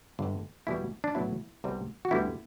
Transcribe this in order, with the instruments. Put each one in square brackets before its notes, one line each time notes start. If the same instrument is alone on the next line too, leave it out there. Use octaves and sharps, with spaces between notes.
[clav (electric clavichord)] G1 G2 D3
E2 B2 G3 B3 E4
D4
B1 A2 F#3 B3 E4
C2 C3 G3 B3
F#4
D2 D3 G3 B3 E4